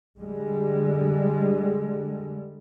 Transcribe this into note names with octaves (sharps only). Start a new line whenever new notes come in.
D3 G3 G#3